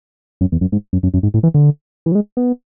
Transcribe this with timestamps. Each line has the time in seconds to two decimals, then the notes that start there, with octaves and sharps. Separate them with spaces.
0.41 F#2
0.52 E2
0.61 F#2
0.72 G#2
0.93 F#2
1.03 F#2
1.14 F#2
1.23 G#2
1.34 A2
1.43 E3
1.54 D3
2.06 E3
2.12 F#3
2.15 G#3
2.37 B3